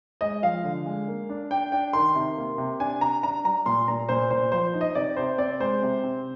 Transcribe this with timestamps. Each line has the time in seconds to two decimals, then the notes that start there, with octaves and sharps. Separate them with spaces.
0.21 G#3 D#5
0.43 F3 F5
0.64 D3
0.86 G#3
1.08 A#3
1.29 D4
1.50 D4 G5
1.72 D4 G5
1.93 D#3 C6
2.15 C3
2.37 A#3
2.58 C3
2.80 D4 G#5
3.01 D4 A#5
3.23 D4 A#5
3.44 G3 A#5
3.66 A#2 C6
3.88 A#2 A#5
4.09 A#2 C5
4.31 A#2 C5
4.52 F3 C5
4.74 D#4
4.81 D#5
4.95 C3 D5
5.17 C3 C5
5.38 C4 D5
5.60 G#3 C5
5.82 C3
6.04 C4